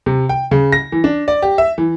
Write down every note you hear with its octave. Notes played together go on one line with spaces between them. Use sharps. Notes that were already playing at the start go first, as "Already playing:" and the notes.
C3
G5
C#3
A#6
E3
D4
D5
G4
E5
E3